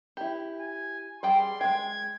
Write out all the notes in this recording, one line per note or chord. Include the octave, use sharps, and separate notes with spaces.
E4 G4
G#5
G3 G#4 G5 C6
G#3 G5 G#6